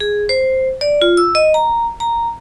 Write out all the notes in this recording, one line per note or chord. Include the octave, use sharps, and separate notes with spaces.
G#4
C5
D5
F4
E6
D#5
A#5
A#5